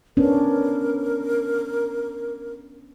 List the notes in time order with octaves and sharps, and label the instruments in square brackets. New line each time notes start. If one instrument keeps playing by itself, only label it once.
[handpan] B3 C#4 D4 [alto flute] A#4